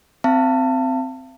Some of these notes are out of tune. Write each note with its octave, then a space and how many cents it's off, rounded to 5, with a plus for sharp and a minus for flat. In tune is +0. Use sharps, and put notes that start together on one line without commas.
C4 -15 F5 -45 A5 +25